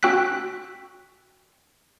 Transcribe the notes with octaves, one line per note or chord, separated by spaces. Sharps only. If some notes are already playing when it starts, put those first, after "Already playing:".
C#4 F#4 G5 E6 F#6 B6